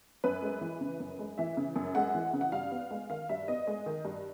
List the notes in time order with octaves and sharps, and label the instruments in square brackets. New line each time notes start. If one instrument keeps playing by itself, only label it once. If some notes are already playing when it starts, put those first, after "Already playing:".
[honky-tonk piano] F#2 B4
G#3
E3
C#3
F#2
G#3
E3 E5
C#3
F#2
G#3 F#5
E3
C#3
F#5
G2 F5
B3
G#3
D#3 F5
G2 E5
B3 D#5
G#3 D#5
D#3
G2